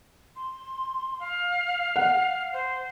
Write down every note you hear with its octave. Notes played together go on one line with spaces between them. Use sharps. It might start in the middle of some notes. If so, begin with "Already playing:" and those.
C6
F5
F#5
C5